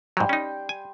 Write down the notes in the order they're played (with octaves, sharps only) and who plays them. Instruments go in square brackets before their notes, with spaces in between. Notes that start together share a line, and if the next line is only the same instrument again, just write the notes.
[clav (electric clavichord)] G#2 F#3 [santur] G3 G5 C6
[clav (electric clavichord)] C#4 D#4
G#5